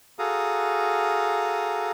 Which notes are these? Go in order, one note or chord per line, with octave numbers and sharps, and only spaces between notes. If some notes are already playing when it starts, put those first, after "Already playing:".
F#4 G#4 A4 F5 A#5 D#6